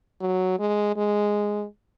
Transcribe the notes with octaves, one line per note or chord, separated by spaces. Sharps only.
F#3
G#3
G#3